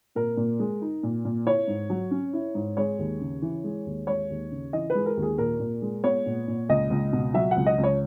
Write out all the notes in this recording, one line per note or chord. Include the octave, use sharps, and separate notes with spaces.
A#2 A#4
A#2
G#3
D#4
A#2
A#2
E4 C#5
G#2
F#3
C#4
E4
G#2
G#3 C#5
D#2
C#3
E3
G#3
D#2
G#3 C#5
D#2
C#3
E3 D#5
B4
G#3
A#4
D#2
G#4
A#2 A#4
A#2
G#3
B3 C#5
A#2
A#2
C#2 D#5
C#2
B2
F#3 E5
C#2 F#5
D#5
C#2
C#5